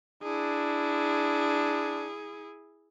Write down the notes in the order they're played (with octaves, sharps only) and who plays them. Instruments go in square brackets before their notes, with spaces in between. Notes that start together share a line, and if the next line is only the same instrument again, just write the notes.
[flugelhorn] D4 [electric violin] E4 G#4